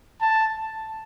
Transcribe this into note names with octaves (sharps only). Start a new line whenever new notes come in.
A5